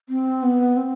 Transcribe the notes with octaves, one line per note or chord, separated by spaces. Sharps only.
C4
B3
C4